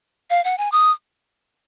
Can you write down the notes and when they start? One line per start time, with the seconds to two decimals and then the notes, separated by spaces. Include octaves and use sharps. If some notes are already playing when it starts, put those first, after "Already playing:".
0.30 F5
0.44 F#5
0.58 G#5
0.72 D#6